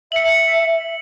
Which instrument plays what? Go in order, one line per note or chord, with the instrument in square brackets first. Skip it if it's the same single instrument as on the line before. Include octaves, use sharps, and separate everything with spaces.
[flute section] E5 [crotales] C#7 F#7